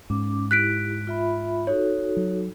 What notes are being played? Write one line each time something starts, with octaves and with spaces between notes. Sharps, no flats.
G#2 C#4 D6
E4 G4 F#6 B6 D7
F4 E5 B5
D#4 F#4 A4 C#5
F#3